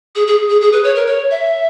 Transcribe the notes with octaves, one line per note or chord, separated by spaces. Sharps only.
G#4
G#4
G#4
G#4
B4
C#5
A#4
C#5
E5